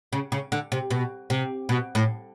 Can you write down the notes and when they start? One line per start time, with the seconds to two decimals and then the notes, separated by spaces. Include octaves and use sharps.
0.13 C#3
0.32 C#3
0.52 D3
0.72 C3
0.91 B2
1.30 C3
1.69 B2
1.95 A2